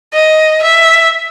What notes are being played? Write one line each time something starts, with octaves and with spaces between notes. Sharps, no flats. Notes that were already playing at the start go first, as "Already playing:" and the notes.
D#5
E5